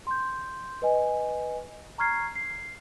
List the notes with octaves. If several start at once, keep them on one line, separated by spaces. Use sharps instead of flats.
C6 G6
B4 D#5 G#5
A#5 C#6 F6 G#6 C7
C7